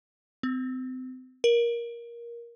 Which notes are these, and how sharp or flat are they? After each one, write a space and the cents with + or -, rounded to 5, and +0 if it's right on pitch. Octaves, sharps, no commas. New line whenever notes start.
C4 -35
A#4 +15